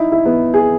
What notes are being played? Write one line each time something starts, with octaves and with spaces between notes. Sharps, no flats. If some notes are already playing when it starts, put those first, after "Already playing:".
Already playing: D#4 E4
E4
B3
G#4